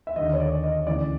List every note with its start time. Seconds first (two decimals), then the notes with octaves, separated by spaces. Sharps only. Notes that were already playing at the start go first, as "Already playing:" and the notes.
0.07 E5
0.16 D#2 D3 D#5
0.33 C#5
0.40 D5
0.64 D#5
0.87 D2 C#3 E3 D5